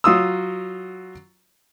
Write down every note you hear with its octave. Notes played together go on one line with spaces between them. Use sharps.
F#3 F4 D#6 E6